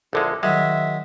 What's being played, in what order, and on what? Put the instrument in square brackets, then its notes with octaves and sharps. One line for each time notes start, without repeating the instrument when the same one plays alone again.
[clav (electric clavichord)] A#1 D3 G#3 [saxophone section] E2 E4 A4
[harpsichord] D#3 F#3 [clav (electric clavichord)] G#3 [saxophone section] E5